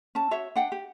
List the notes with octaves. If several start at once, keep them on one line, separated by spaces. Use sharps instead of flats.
C#4 A5
F#4 C#5 E5
D4 F#5 G5
G4